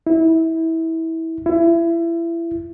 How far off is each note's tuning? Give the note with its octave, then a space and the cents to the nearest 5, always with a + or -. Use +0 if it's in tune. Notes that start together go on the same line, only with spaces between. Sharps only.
E4 -25
E4 +25